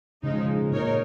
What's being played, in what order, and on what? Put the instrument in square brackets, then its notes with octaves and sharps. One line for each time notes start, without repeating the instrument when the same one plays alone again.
[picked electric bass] C#3 [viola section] F3 G#3 D#4
[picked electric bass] C#3
[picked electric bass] A#2 [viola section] D#4 A#4 C#5